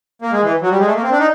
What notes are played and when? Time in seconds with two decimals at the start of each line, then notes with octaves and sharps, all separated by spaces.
0.22 A#3
0.32 G#3
0.43 E3
0.62 F#3
0.70 G3
0.79 G#3
0.86 A3
0.95 A#3
1.03 C4
1.11 D4
1.19 D#4